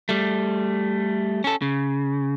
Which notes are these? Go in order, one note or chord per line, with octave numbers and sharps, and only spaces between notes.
G3 A3
C#4 A4
C#3